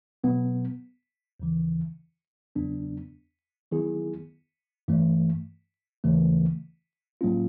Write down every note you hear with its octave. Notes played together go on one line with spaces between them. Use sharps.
B2 F#3 B3
D#2 C#3 E3
E2 C#3 F#3 B3 D4
D#3 F#3 B3 E4 G#4
G2 E3 A3
D#2 C#3 E3 A3
A2 F#3 A#3 C#4 F4